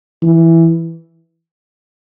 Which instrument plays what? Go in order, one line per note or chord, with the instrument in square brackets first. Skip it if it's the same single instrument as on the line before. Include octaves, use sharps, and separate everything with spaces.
[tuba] E3